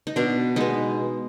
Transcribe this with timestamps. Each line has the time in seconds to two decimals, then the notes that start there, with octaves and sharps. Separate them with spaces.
0.07 D#4
0.16 B2 D4
0.56 G#3 B3 D#4